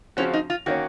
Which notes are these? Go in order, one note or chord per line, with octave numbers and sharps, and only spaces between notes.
C#3 F3 C4 C#4 F#4
D#4
F4
D#3 A#3 C#4 F#4